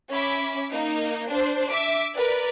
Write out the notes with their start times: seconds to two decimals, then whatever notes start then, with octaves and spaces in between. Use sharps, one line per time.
0.10 C#4 E5 B5 D6
0.71 A#3 D#4
1.28 D4 C5
1.69 E5 D6
2.14 A#4 B4 D5